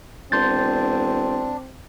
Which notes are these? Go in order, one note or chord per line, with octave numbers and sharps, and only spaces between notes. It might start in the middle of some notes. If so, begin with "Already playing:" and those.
E1 C4 D4 C6 G6 A6